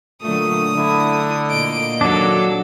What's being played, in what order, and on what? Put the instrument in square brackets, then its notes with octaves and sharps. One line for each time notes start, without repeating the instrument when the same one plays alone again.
[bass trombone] A#2 [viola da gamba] D3 F#3 A3 [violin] D#6
[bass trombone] D3 [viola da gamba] E4
[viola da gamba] A#2 A#3 D#5 [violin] D7
[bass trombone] D#2 [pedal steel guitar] F#3 D4 [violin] A4